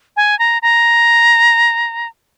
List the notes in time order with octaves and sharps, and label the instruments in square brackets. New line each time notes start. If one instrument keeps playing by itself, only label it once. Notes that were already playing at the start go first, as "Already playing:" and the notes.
[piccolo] G#5
A#5
A#5